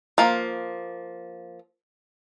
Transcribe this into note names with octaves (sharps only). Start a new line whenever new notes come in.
F3 A#3